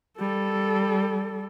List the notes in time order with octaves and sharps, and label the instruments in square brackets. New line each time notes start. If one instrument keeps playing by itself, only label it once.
[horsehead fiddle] G3 A4